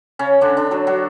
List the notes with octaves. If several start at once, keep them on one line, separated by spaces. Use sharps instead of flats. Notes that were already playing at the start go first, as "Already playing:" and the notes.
C#3 C#4
D3 D4
D3 D4
F#3 F#4
F#3 F#4